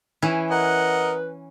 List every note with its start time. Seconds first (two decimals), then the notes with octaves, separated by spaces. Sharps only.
0.22 E3 C#4 E4
0.51 A#4 B4 D#5 F#5